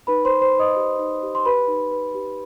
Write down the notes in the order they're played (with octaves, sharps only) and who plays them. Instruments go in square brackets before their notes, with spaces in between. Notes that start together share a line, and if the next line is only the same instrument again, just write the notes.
[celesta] D#4 B4 B5
C5 C6
B4
C5 C6
D#4
D#5 D#6
G4
D#4
G4
C6
G4 B4 B5
D#4
B4
G4